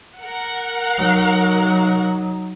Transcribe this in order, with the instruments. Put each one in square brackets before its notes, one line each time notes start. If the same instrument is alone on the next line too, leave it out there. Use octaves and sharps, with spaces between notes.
[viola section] A#4 F#5
[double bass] F#3 D#4